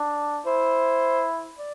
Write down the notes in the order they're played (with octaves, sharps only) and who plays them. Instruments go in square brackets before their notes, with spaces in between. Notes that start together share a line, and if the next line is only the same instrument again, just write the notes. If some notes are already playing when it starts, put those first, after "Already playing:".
Already playing: [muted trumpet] D4
[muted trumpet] E4 [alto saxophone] C5
[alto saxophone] D5